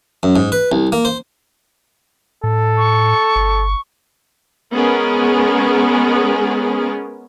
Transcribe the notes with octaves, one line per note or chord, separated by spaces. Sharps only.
F#2
G#2
B4
C2
A#3
C5
A2 A4
C#6
G1
G#3 B3 C#4 G#4 A#4